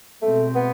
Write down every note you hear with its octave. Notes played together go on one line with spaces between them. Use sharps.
B2 G#3 A3 C4
B3